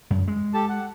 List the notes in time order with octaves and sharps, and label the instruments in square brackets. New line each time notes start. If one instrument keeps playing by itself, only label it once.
[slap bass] F#2
G#3
[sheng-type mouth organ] G4 A4 A5
F#5